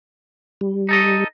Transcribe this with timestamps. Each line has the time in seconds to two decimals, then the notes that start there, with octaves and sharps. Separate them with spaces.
0.61 G3
0.89 D#4 A4 D#5